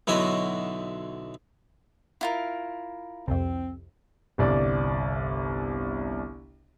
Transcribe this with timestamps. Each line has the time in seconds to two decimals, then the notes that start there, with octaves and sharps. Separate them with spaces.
0.07 B1 D3 E4 F#4 C#5 D#5
2.21 E4 F4 A#4
3.28 C2 F2 C4
4.38 G1 C2 D5